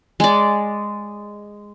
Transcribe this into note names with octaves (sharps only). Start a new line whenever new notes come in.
G#3 D5